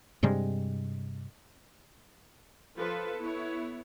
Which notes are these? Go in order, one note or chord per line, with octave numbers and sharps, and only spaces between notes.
G2 C3 G3 G#3
F3 F4 A4 B4
B3 E4 C#5